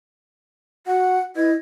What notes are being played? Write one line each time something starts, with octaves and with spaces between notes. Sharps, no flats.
F#4 F#5
E4 B4 D#5 G#6